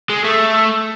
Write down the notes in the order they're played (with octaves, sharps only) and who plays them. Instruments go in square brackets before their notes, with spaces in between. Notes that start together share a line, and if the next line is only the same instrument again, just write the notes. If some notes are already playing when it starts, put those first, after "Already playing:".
[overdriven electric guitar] G#3
A3